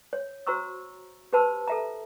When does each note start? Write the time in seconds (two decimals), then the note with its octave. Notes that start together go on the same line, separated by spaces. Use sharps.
0.13 C#5
0.47 F#4 C5 A#5 C#6 E6
1.33 G4 B4 C5 A5 B5 E6
1.68 A4 E5 A#5